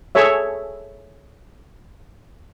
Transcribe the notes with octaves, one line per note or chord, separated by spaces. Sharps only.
G#4 A4 C#5 E5